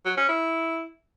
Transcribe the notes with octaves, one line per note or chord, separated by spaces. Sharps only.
F#3
C#4
E4